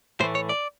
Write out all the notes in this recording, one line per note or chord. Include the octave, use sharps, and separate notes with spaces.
A2 E3 A3 C5
C#5
D5